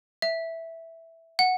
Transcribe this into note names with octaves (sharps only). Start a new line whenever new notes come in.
E5
F#5